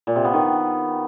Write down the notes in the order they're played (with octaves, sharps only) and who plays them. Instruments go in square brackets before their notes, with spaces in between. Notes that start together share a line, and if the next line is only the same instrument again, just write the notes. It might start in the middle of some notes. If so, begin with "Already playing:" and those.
[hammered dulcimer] A#2
C3
B3
D#3